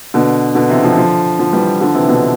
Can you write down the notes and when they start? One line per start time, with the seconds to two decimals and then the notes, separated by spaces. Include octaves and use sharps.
0.14 B2 D3
0.55 B2 D3
0.69 C3 E3
0.83 D3 F3
0.97 D3 F3
1.39 D3 F3
1.52 E3 G3
1.81 D3 F3
1.94 C3 E3
2.09 B2 D3